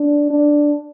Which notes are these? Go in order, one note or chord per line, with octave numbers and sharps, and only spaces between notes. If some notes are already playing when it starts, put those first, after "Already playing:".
Already playing: D4
D4